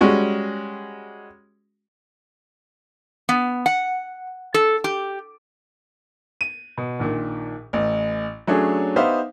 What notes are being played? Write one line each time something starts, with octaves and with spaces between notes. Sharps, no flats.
G3 G#3 C#4 F#4
B3
F#5
A4
G4
D#7
B2
A#1 A#2 D#3
A1
F#3 A3 C#4 D4 G#4
B3 D#4 G4 C5 E5 F5